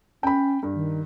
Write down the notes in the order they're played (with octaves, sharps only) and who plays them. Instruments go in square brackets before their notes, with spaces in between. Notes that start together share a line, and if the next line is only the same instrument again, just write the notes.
[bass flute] C#4 [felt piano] G5 B5
[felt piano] G2
[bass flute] D#3